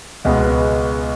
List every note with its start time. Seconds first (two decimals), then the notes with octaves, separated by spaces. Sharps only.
0.25 C#2 B2 G#3 B3